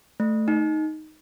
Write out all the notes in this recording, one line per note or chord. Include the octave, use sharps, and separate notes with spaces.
A3
D#4